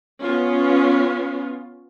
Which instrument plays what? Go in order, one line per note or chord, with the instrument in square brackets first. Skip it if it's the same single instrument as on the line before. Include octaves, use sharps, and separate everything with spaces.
[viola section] B3 C#4 F4